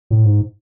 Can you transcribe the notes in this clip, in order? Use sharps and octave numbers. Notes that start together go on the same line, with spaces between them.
A2
G#2